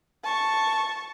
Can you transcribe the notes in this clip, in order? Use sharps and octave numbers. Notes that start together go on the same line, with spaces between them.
A5 C#6